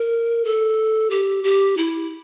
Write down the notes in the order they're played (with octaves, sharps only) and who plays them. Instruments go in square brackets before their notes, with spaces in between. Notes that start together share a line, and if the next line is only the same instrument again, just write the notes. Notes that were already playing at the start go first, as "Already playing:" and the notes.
Already playing: [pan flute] A#4
A4
G4
G4
E4